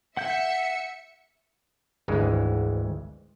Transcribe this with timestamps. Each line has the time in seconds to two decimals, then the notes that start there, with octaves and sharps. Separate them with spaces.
0.17 E5 F#5 G6 C#7
2.08 G#1 D2 E3 G#3